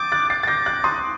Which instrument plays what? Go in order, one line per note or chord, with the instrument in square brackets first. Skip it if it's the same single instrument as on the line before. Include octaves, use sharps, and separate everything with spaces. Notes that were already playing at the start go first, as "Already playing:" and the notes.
Already playing: [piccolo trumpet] D6 [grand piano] D#6 G6 A6
[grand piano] F#6 A6
[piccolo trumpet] D6 [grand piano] A6 C7
[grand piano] A6
G6 A#6
F#6 A6
C6 D#6